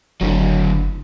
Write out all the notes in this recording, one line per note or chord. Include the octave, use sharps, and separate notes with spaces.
F#1 D3 F#3